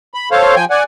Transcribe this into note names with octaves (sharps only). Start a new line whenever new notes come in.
B5
A4 C5 C#5 F5
F3 G5 G#5
D5 F#5 G#5